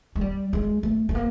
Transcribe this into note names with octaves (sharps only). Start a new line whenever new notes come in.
G#3
G3
G#3
A3
A3
A#3